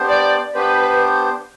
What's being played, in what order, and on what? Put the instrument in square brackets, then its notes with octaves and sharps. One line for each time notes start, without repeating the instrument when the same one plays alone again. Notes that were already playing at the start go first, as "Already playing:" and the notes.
Already playing: [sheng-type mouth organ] B3 D4 G4 C5
[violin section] D5
[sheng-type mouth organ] B3 D4 G4 C5 [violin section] B4